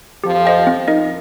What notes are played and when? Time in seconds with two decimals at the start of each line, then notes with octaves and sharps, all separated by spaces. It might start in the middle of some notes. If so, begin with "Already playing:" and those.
0.24 F2 F3 G4
0.45 C5 D#5 G5
0.67 C4
0.88 D#4 A#4 D#5